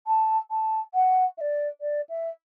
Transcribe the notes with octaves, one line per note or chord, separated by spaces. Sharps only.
A5
A5
F#5
E5
D5
D5
E5